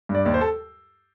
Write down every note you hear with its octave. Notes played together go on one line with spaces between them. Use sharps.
G2
D5
D#2 D5
C5
A4